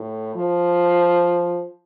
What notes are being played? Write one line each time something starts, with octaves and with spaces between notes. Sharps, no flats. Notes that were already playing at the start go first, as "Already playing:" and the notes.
Already playing: A2
F3